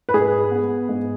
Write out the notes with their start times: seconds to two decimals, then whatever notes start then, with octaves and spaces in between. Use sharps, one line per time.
0.09 B4
0.14 G#2 G#4
0.51 B3
0.89 G#2